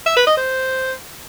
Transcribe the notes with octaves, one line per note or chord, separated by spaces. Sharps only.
E5
B4
D#5
C5